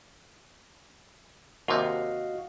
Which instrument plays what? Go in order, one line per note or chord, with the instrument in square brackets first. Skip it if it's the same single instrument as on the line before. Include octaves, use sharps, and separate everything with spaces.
[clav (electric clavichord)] D#2 C3 [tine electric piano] F#4 D#5 F5